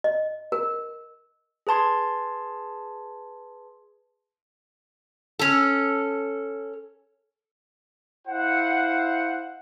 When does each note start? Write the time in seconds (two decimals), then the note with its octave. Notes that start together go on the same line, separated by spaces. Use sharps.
0.04 D#5
0.52 A#4
1.67 G#4 B4 A5 C6 G#6
5.39 C#4 A4
8.28 E4 C5 F5 F#5